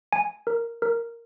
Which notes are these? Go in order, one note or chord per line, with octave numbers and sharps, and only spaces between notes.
G#5
A#4
A#4